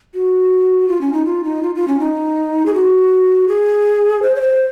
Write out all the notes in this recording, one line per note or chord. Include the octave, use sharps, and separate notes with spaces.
F#4
F4
C#4
D#4
F4
D#4
F4
F4
C#4
D#4
G#4
F#4
G#4
C5
C#5
C5